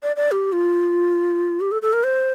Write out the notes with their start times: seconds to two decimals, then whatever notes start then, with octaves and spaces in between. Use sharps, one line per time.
0.03 D5
0.16 D5
0.31 G4
0.52 F4
1.61 G4
1.72 A4
1.82 A4
1.93 A#4
2.04 C5